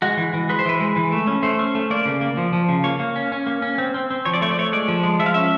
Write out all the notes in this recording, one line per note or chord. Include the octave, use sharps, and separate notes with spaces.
G#3 F#4
E3
E3
G#3 B4
C5
E3 B4
G#3
E3
A3
C#4
A3 C5
C#4
A3
A#3 D5
C#3
A#3
F3
F3
C#3
A#3 C#5
A#3
C#4
C#4
A#3
C#4
C4
C4
C4
F3 C#5
D5
A3 C#5
D5
A3 C#5
G#3 D5
F3
G#3
F3 E5
F5
C#4 E5